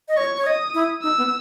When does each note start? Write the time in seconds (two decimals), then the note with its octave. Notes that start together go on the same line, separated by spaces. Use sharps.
0.08 D#5
0.17 C#5 C#6
0.37 C#5
0.46 D#5 D#6
0.74 E4
1.03 D#4 E6
1.18 B3